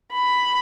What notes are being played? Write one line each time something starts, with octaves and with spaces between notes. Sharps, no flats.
B5